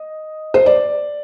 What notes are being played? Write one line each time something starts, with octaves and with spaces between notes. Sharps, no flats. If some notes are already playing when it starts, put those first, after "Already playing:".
Already playing: D#5
C5
D5